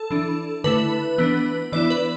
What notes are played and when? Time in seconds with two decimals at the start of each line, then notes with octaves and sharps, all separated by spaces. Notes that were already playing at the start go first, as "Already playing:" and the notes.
Already playing: A4
0.11 E3 D4
0.64 D3 A3 E4 B4
1.18 E3 B3 D4
1.72 E3 B3 E4 D5
1.90 B4